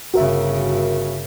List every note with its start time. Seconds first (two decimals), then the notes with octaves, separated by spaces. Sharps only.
0.14 G1 C#3 F#4 A#4 E5